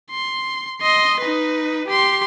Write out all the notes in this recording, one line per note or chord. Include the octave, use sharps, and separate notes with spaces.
C6
D#5 C6
D#4 B4
G4 C6